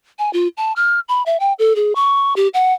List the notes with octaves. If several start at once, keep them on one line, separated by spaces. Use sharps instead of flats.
G#5
F4
A5
F6
B5
E5
G5
A4
G#4
C#6
G4
F#5